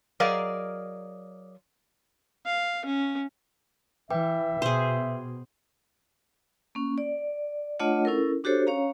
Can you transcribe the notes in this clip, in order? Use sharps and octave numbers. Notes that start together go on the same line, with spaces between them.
F#3 G#4 A#4 D5 D#5 F5
F5
C#4
E3 B4 E5 G5 D6
B2 G#4 C5
A#3 C#4
D5
A3 D4 F4 C#5 D#5 F#5
C#4 E4 A4 A#4
D4 F#4 G4 A4 C5 C#5
C#4 C#5 F5 A#5